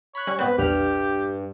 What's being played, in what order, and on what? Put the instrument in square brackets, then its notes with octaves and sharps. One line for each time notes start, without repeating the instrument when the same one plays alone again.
[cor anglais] C#5 [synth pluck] B5 F#6
[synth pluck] G3 C#4
[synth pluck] G#2 B3 C4 [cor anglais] B4
[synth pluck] A#1 E2 F6 [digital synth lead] G2 [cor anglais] G4